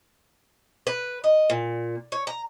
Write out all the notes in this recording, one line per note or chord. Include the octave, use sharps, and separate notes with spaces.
B4
D#5
A#2
C#5
A#5